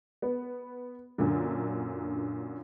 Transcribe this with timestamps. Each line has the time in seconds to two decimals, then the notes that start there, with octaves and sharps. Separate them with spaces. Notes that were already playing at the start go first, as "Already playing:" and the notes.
0.22 B3
1.18 F#2 A#2 D3